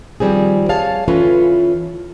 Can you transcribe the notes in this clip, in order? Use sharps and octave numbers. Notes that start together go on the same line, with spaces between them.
D#3 F3 G3 C4 G#4
G#4 C#5 F5 A5
E3 C#4 F4 A4 B4